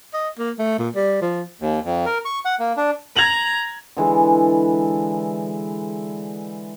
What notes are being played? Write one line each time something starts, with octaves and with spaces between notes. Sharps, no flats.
D#5
A#3
A3
A#2
G3
F3
D#2
F2
A#4
C#6
F#5
A#3
D4
A#5 G#6 F7 F#7
D3 E3 G#3